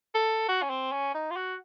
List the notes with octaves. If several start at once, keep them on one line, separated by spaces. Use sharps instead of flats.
A4
F#4
C#4
C4
C#4
D#4
F4
F#4